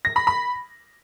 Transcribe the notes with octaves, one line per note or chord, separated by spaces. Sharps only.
A#6
B5
B5